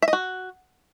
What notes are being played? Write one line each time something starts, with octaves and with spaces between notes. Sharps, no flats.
E5
D#5
F#4